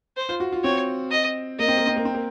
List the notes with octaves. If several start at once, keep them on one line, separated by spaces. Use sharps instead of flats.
C5
F4
F#4
F4
C4 C#5
D#5
A#3 D#5
C4
A#3
C4
A#3
C4
A#3